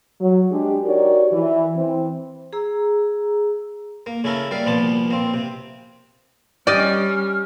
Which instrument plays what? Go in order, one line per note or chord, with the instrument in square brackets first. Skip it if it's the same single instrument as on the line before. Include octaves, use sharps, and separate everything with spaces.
[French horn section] F#3
G#3 D4 G4
D#4 F#4 G4 A#4 C#5 D5
E3
E3 C4
[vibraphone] G#4 A#5 E6
[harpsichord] A#3
C#3 A3 E4 A4 A#4
G3 A#3 D5 F5
C2 A#2 F3 B3 A5 D6
A#3 C4
C3
[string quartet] G3 C#4 [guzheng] G4 D#5 G5 [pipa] D5 [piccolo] F6